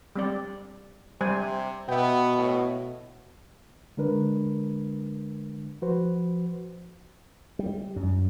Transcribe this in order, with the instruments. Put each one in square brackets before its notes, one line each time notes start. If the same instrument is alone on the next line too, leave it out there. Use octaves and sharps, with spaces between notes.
[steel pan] G3 C4 D5
[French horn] C3 [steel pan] G3 C5 G#5
[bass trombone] B2 [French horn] B3 [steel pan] E5 G5
[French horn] A2
[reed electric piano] D3 G#3 D4 A#4 B4
F3 F#4 B4 C5
[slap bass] G3
F#2